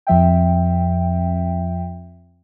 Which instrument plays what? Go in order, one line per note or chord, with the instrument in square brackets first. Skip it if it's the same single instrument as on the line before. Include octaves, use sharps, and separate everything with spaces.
[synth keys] F2 F3 E5 G5